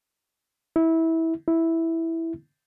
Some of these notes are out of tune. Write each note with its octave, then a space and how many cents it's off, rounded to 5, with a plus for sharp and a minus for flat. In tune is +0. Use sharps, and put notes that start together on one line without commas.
E4 -20
E4 -5